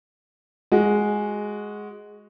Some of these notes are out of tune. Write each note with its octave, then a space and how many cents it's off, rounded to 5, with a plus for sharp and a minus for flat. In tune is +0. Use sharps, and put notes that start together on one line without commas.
G#3 +0 F#4 +0